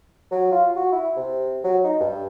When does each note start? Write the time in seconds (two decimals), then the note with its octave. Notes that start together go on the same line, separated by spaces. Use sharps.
0.31 F#3
0.52 F4
0.76 F#4
0.92 E4
1.16 C3
1.64 F#3
1.84 D#4
2.00 G2